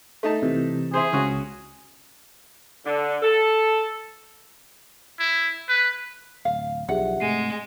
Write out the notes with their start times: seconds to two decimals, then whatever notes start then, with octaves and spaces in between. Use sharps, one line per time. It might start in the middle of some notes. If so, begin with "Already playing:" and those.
0.23 A3 D#4 A5
0.43 C3 E3
0.94 E4 G#4 C5
1.13 C#2 C#4 F#4
2.86 D3
3.23 A4
5.19 E4
5.69 B4
6.45 D1 F5
6.89 B1 F3 D4 G4 G#4 E5 F#5
7.20 G#2 C3 G#3 A3 C7 D#7